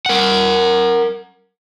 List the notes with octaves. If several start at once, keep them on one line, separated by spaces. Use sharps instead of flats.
A#4 F#5